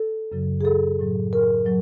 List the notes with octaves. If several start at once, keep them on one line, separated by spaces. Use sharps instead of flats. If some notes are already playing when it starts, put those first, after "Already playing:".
Already playing: A4
F#2 C#3 F#3
G#4
A4
A2 F#3
A#4
F#3